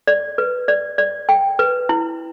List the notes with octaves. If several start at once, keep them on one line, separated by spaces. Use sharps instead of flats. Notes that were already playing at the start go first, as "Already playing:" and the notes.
D5
B4
D5
D5
G5
B4
E4